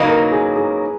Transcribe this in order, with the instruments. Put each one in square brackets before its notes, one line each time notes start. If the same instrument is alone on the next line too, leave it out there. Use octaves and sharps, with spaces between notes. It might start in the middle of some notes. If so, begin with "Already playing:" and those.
Already playing: [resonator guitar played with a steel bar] C#3 F#3 A#3 D#4 [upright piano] B4
[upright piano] A#4
G#4
G#4